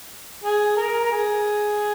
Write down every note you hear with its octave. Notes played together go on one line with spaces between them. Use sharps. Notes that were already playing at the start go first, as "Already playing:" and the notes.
G#4
A#4
A#4
G#4